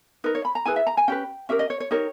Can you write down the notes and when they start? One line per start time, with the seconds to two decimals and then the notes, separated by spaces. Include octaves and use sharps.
0.24 D#4 A#4 B4
0.35 C#5
0.45 B5
0.55 A#5
0.66 E4 G#4 B4 G#5
0.76 E5
0.87 A#5
0.97 G#5
1.08 C#4 G4 B4 G5
1.49 C#4 G4 A#4 E5
1.59 D#5
1.70 C#5
1.80 C#5
1.91 D#4 G4 A#4 C#5